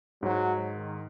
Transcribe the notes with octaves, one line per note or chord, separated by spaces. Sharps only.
G#2 F#3
D#3